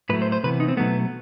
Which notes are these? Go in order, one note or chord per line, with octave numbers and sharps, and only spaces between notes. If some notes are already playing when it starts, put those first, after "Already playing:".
A2 F#3 A3 B4
C5
C5
C3 E3 B3 B4
D#4
C4
B2 F#3 A3 B3